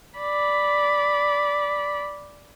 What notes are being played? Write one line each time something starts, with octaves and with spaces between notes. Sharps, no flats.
D5 B5